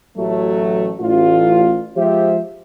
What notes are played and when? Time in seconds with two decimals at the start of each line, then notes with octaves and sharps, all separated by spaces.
0.17 A1 F#3 A3
1.00 A1 F4
1.96 F3 G#3 G4 C5 E5